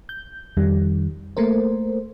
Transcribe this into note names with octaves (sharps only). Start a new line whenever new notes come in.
G6
F2 D#3 G3
A3 A#3 A#4 C5